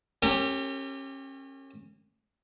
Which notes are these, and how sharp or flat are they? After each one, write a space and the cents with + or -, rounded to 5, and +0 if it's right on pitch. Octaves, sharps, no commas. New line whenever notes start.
C#4 -30 G4 +0 A#4 -40